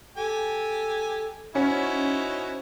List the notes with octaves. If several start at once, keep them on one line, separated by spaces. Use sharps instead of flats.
G4 A4 G#5
C#4 D#4 E4 F#4 C5